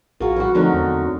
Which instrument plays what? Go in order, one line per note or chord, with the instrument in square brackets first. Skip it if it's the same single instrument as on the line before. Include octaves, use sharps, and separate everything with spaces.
[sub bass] A#1 [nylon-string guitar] F4 F#4 G#4 [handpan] A#4
[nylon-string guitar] E3 G3 F#4
[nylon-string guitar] D3 F#3 A3 [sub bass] F3 [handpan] C4 D#4 A#4
[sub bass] E2